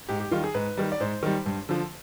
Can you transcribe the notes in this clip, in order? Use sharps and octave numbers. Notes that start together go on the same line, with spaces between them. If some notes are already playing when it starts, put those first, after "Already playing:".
G#2 G4
G4
D#3 G3 F4
G#4
G#2 B4
D#3 G3
D5
G#2 C5
D#3 G3
G2
D3 F3